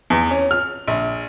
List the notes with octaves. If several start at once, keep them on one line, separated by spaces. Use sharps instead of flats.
E2
C#4
F6
A#1